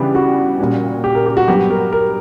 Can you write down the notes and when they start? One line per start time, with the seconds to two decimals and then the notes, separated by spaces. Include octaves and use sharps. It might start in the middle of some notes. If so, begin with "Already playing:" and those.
Already playing: C#3 E3 G3 B3 D4 G4
0.15 F#4
0.59 A#2 G3 C#4
1.04 G4
1.15 A#4
1.26 G4
1.37 F#4
1.48 G2 F#3 B3 G4
1.70 A#4
1.92 A#4